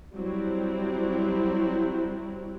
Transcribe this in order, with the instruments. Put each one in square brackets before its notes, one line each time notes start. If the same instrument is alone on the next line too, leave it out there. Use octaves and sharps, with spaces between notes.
[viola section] F#3 G3 C4 E4